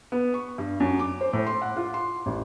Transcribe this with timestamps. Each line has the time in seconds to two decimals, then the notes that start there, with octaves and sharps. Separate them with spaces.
0.12 B3
0.34 C#6
0.58 G2
0.80 F#2
0.99 D6
1.21 C5
1.33 A2
1.47 C6
1.62 F#5
1.76 F4
1.94 C6
2.26 A1